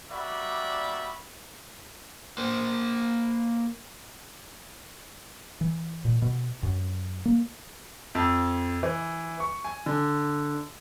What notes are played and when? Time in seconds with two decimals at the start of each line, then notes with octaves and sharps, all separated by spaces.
0.12 G3 A#3 F#4 D5 E5 B5
2.38 A#3 C5
5.61 E3
6.05 A#2
6.22 B2
6.63 F#2
7.25 A#3
8.15 F2
8.83 E3
9.40 C#6
9.64 G#5
9.86 D3